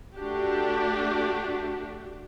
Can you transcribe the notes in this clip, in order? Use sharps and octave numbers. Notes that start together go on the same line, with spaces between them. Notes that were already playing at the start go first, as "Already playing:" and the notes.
A3 D4 F#4 G4